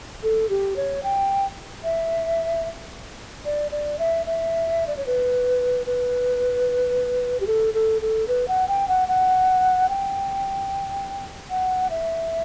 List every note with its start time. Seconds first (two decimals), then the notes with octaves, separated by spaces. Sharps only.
0.23 A4
0.50 G4
0.76 C#5
1.03 G5
1.84 E5
3.45 D5
3.71 D5
3.99 E5
4.26 E5
4.87 D5
4.97 C#5
5.06 B4
5.86 B4
7.40 G4
7.47 A4
7.74 A4
8.02 A4
8.28 B4
8.48 F#5
8.68 G5
8.88 F#5
9.08 F#5
9.89 G5
11.50 F#5
11.90 E5